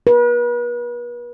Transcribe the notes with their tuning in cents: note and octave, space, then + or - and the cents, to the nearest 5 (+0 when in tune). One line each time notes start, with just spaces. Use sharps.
B4 -40